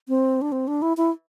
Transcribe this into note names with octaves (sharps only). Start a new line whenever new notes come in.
C4
D4
C4
D4
E4
E4